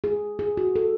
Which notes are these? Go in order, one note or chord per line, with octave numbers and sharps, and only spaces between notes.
G#4
G#4
F#4
A4